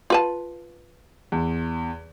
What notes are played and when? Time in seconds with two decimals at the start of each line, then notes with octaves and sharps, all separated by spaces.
0.10 F4 B4 A5
1.32 E2